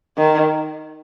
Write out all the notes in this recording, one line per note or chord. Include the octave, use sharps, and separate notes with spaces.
D#3